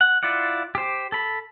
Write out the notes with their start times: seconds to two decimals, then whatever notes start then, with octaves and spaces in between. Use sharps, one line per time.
0.01 F#5
0.23 E4 F4 D5 F#5
0.75 G4 C5
1.12 A4 B5